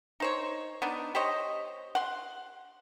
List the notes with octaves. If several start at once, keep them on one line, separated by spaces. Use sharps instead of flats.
D#4 C5 C#5
B3 D4 D#4
G4 C5 C#5 D#5
F#5 C6